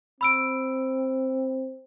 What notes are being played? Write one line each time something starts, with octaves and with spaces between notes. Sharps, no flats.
C4 B5 E6 D7